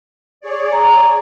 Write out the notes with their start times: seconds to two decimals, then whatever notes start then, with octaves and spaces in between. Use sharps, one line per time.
0.41 G#4 C#5 D5
0.72 A#5